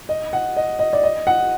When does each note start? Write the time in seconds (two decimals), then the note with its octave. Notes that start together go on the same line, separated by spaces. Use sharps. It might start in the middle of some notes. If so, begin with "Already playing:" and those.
0.09 D#5
0.33 F#5
0.57 D#5
0.79 D#5
0.93 D5
1.03 D#5
1.27 F#5